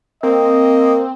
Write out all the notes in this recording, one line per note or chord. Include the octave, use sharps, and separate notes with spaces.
A#3 C4 D#5